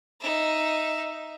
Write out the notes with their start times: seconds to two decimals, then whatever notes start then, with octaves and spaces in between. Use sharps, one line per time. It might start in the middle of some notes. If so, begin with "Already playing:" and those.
0.20 D#4 E5